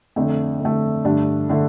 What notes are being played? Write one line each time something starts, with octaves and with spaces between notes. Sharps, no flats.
F2 D3 A3
F2 D3 A3
G2 D3 A3 D4
D3 A3